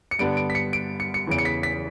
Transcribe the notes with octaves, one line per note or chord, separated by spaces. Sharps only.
C#7
G2 D3 G3 B3 D4 D7
D7
B6
C#7
D7
C#7
C#7
E2 C#3 E3 D7
C#7
B6
B6